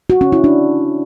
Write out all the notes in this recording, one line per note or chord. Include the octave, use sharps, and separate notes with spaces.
F#4
C#4
E4
D4